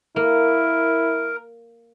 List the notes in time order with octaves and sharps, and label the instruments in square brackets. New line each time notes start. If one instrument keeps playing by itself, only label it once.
[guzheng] A#3 [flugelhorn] E4 [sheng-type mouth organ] A#4